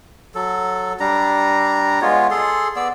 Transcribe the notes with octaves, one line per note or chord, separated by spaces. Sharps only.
F#3 A4
G3 D4 A#5
G#3 B3 F4 C#5
G#4 A4 C6
B3 D5 E6